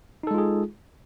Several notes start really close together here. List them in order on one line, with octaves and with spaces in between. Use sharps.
D#4 A4 G#3 F4 G#4